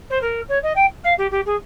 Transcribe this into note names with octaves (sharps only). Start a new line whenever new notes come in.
C5
A#4
C#5
D#5
G5
F5
G4
G4
G#4